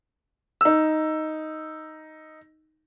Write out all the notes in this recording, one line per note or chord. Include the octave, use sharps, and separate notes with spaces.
D#4 E6